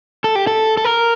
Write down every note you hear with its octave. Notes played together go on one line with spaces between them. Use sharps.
A4
G4
A4
A4
A#4